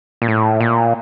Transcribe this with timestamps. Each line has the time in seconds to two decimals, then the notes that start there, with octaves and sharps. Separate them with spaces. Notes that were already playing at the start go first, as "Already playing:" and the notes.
0.22 A#2
0.28 A2
0.60 A#2